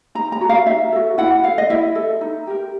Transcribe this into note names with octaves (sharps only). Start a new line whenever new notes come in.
D#4 A#5
A#5
F#4 A4
F5
D#4 E5
F#4 A4
E4 F#5
A4 F5
D#5
E4 E5
A4
D#4
G4 A#4